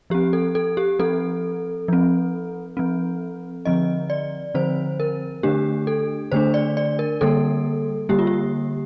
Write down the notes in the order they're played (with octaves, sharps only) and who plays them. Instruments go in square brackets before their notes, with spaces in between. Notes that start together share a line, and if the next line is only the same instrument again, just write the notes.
[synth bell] F3 C4 G4
A4
A4
G4
F3 C4 A4
F3 C4
F3 C4
D3 F3 C4 D#5
D5
D3 F3 C4 C5
A#4
D3 A3 D4 G4
A4
D3 A3 D4 C5
D5
D5
A#4
D3 G3 A#3 A4
D3 G3 A#3 G4
F4
G4